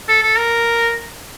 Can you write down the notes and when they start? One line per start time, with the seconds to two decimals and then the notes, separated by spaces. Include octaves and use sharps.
0.09 A4
0.23 A4
0.38 A#4